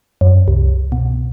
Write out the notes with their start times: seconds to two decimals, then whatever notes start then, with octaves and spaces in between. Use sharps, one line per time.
0.21 F#2
0.48 C2
0.92 B2